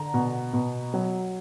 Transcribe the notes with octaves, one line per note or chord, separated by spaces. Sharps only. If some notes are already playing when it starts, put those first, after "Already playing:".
Already playing: D3 A#5
B2
B2
F#3